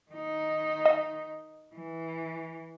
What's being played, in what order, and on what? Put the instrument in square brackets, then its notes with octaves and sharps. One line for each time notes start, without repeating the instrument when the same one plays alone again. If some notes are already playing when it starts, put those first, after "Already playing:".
[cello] D#3 D#4
[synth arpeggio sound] D#5
[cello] E3